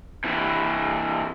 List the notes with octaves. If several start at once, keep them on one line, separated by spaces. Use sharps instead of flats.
C3 E3